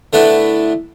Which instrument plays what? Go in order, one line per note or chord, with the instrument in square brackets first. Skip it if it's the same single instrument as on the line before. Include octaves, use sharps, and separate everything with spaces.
[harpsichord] D3 A3 B3 D4 E4